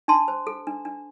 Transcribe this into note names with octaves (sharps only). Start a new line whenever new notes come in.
D4 A5 C6
C5
A4
D4
D4